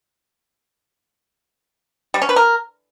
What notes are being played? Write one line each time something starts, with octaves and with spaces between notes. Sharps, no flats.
G3
C#4
B4
A#4